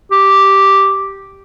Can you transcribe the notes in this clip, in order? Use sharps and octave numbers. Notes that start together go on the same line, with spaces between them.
G4